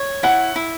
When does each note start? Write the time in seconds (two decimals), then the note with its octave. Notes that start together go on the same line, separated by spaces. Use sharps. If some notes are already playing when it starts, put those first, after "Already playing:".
Already playing: C#5
0.23 E4 F#5
0.56 E4